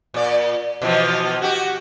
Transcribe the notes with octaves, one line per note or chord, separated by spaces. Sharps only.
A#2 D5
B2 E3 F3
F#4 G4